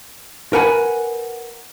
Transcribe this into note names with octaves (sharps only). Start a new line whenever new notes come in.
A#4 B4 F#5 G#5 A#5 B5